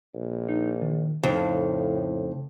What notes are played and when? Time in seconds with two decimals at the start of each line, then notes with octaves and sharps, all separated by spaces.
0.14 A#1
0.49 D#4
0.82 D#3
1.23 F2 A2 C#3 D#4 F5